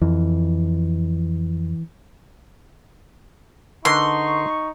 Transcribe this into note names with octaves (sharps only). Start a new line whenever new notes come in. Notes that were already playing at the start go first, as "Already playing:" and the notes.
F2 E3
D3 D#4 A#4 B4 C6 C#6